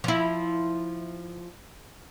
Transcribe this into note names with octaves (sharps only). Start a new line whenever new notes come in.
F3 E4